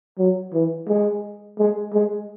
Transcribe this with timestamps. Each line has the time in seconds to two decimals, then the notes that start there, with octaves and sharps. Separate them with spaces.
0.19 F#3
0.53 E3
0.88 G#3
1.59 G#3
1.94 G#3